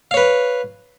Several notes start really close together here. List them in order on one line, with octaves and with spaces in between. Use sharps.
F5 C#5 B4